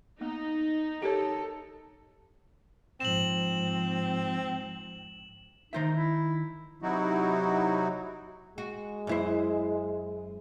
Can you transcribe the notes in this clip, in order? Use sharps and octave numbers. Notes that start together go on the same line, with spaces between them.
A#3 B3 D#4
G4 A4 A#4 C#5
G#2 F3 C4 E7 F#7
D#3 D#4 C5 E5
E4
C3 F#3 D#4 E4 F#4
G#3 F#4
F#2 E4 C5